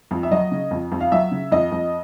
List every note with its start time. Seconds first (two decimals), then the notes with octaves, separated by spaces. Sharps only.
0.11 F2
0.23 E5
0.31 F#3 D#5
0.51 C#3
0.71 F2
0.92 F2
1.01 F5
1.12 F#3 E5
1.31 C#3
1.52 F2 D#5
1.72 F2